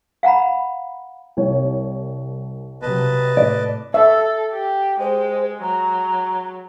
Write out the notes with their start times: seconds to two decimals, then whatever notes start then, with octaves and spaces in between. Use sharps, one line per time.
0.23 F5 F#5 A#5 B5
1.37 C2 C#5
2.82 C3 F#3 B4 D#5 A5
3.37 A2 D5
3.94 A4 E5
4.53 G4
5.00 G#3 C5
5.62 F#3 A#5